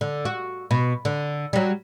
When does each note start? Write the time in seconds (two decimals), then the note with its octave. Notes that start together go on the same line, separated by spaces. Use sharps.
0.01 D3
0.25 F#4
0.71 B2
1.05 D3
1.53 F#3 G3